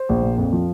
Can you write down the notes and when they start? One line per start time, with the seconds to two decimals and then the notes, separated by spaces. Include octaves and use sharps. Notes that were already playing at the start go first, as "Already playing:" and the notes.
Already playing: C5
0.09 A#1
0.22 A#2
0.38 F2
0.53 F3